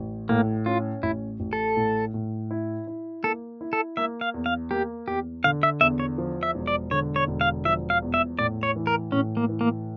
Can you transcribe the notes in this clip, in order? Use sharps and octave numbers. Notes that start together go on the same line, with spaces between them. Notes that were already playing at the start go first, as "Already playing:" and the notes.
Already playing: A1
A2 A#3
C#4 F4
A1 E4
A1
A4
A2
A2
E4
E4
A#3 A4
E4
A4
A#3 E5
F5
E2
F5
A#3 G4
E2 G4
D3 F5
E5
E2 E5
C#5
F3
E5
E1
D5
D3 C#5
C#5
E1
F5
F3 E5
F5
E2
E5
A2 D5
C#5
E3
A#4
A2 C#4
A#3
E3
A#3